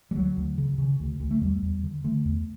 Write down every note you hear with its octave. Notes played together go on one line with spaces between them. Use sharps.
G3
D2 F#3
D2
C#3
C#3
D2
D2
A3
E2 G3
E2
D3
D3 A3
E2